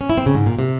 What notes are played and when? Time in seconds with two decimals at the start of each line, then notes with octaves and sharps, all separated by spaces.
0.01 C#4
0.10 E4
0.18 C4
0.26 C#3
0.34 G#2
0.46 A#2
0.59 C3